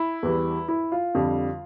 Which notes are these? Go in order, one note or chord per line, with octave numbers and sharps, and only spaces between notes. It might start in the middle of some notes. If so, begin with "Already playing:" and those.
Already playing: E4
E2 E3 G3
E4
F4
F2 D3 G3